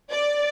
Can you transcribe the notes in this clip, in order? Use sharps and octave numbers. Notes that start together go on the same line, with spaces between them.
D5